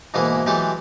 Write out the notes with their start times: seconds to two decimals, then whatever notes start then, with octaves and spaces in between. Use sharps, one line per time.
0.14 G#2 B2 E3 A#3 B3 E4
0.46 E3 F#3 G#3 A3 G4 A4